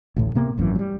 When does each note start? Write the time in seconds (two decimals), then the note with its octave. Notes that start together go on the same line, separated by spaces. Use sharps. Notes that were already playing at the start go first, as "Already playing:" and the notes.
0.16 A1 D2 A2
0.35 C3 A#3 B3
0.57 G#1 F#2 D3 E3
0.75 F#3 G3